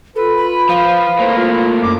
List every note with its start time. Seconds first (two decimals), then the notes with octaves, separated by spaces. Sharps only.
0.16 F4 A4 B4
0.38 B5
0.69 F3 F5
1.19 A2 A#3 C5
1.37 F4
1.83 F#2 D6